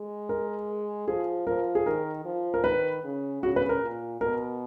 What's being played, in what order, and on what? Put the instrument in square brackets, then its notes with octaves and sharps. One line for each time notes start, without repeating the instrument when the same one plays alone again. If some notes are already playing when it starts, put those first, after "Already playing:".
Already playing: [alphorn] G#3
[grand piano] A#4
[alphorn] F3 [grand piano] G#4
[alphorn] F3 [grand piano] A#4
[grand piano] G#4
[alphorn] D#3 [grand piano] A#4
[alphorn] F3
[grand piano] A#4
[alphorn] D#3 [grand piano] B4
[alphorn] C#3
[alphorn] C#3 [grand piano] F#4
[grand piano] B4
A#4
[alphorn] A#2
[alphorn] B2 [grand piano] A#4